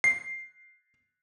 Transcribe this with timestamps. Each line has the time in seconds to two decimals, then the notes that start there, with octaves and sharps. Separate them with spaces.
0.04 C7